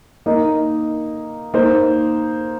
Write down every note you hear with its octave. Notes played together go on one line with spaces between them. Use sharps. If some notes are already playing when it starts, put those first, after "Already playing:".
A#3 D#4 A#4 D#5
A#3 D#4 C5